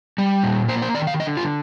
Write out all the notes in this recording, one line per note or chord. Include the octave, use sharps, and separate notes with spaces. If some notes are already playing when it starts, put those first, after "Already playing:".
G3
A#2
A#3 C5
C5
D#3 D5
F5
D3 D#5
F4